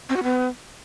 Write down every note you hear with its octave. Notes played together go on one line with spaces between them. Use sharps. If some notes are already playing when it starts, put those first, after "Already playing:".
C4
F#4
B3